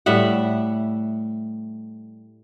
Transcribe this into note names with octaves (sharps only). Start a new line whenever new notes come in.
A2 G3 E5 F#5